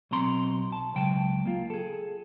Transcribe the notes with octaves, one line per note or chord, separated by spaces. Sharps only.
B1 B2 C4 A#5 C6
A5
C#2 F#3 G5 A5
A#3 F4
G#4 A4